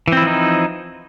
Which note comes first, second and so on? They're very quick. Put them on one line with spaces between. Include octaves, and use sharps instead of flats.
E3 C4 E4 F3 D#4